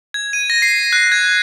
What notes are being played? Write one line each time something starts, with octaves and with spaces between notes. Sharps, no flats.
G#6
D#7
A#6
C7
F#6
G#6